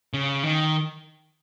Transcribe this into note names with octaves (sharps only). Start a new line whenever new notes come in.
C#3
D#3